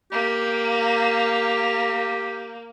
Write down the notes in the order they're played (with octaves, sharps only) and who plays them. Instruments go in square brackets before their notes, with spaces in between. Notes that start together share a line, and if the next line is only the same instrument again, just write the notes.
[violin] A#3 [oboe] G4